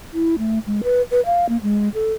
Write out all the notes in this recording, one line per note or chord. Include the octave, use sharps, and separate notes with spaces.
E4
A3
G#3
B4
B4
F5
A#3
G#3
A4